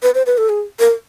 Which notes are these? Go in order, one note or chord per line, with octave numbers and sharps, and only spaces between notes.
B4
C5
B4
A4
G#4
A#4